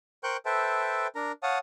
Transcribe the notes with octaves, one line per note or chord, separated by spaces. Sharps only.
A#4 C5 G5 C#6 F#6 G6
A4 B4 C5 E5 G5 A5
D4 A#4 A#5
C#5 F5 F#5 A5 D#6